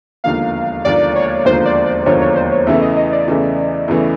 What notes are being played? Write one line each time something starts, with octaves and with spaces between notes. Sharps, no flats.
E1 D#2 D3 F3 A#3 F5
E1 D#2 D3 F3 A#3 D5
C#5
E1 D#2 D3 F3 A#3 C5
D5
D5
E1 D#2 D3 F3 A#3 C#5
C#5
C5
C#5
E2 C#3 E3 A3 E5
D#5
D#5
D5
E2 C#3 E3 A3
E2 C#3 E3 A3